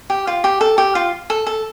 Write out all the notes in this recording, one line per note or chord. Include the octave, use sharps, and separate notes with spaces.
G4
F4
G4
A4
G4
F4
A4
A4